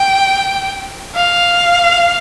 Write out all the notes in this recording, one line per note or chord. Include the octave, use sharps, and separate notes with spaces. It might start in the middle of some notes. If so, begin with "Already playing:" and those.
Already playing: G5
F5